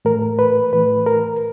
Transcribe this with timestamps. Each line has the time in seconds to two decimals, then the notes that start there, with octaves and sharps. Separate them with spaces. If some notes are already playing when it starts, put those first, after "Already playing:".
0.05 A2 E3 A3 A#4
0.39 B4
0.72 A2 E3 A3 B4
1.06 A#4